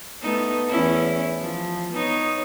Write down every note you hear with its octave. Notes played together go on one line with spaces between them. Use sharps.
A3 B3 D#4
E2 C#4 E4
F3
B3 D#4 C#5